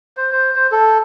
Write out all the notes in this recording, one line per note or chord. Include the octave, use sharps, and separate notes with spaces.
C5
C5
C5
A4